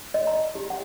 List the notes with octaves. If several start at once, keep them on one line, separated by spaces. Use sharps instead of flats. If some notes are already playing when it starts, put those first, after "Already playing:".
D#5
A#5
G4
F#5